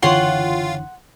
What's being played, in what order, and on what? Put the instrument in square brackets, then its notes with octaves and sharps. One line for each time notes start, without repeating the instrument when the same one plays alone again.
[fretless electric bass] F#1 D3 E3 [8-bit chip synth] F4 [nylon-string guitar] C#5 G5 [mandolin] F#5 C6